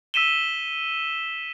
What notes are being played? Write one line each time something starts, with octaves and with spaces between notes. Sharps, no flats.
E6 B6 D#7 E7 G7